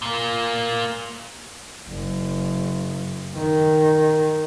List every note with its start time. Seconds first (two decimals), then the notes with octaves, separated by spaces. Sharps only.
0.02 A#2 A#3
1.88 F#1
3.34 D#3